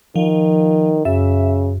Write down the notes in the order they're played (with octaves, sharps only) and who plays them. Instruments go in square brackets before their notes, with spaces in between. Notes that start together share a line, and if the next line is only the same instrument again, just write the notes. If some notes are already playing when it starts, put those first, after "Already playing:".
[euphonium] D#3 [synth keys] F3
[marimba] F#2 [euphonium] C#3 [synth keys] E5